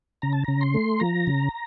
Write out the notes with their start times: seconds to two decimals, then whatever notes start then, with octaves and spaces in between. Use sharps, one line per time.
0.22 C#3 A#5
0.33 A5
0.44 C#3 A#5
0.61 C6
0.74 A3
1.00 F3 A#5
1.27 C#3